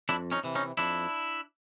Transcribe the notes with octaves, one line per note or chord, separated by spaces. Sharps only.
F2 D4 E4
C#4 D#4
C3 E3
C#4 D#4
F2 D4 E4